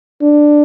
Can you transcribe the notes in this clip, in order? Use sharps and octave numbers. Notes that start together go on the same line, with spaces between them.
D4